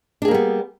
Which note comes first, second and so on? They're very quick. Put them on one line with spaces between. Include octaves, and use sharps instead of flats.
D4 G#4 A#3 G3 B3